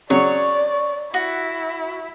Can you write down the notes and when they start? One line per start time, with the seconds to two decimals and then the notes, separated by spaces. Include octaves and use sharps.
0.10 C#3 F#3 C#5 D5
1.14 E4 F#4